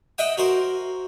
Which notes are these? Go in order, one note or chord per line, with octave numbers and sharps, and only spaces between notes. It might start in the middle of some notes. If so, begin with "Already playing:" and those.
D#5 E5 F#5 G5 D#6
F#4 A#4 C5